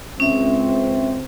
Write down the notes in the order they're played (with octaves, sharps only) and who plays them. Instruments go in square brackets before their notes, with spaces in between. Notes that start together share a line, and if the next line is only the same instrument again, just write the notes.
[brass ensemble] C#2 C4 [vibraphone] C#4 E5